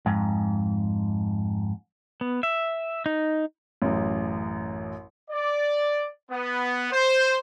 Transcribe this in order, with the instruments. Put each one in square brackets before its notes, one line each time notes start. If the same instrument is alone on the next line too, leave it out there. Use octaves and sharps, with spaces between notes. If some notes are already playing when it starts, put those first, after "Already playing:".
[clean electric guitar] F2 G#2
[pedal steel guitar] B3
E5
D#4
[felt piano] A1 F#2
[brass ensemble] D5
B3
C5